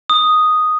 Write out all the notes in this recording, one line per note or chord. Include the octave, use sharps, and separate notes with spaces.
D#6